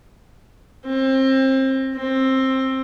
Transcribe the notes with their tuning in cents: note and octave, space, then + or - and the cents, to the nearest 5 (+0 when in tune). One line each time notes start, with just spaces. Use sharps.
C4 +25
C4 +15